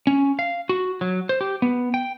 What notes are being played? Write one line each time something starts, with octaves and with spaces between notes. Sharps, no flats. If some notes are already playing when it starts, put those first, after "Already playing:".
C#4
F5
F#4
F#3
C5
G4
B3
G5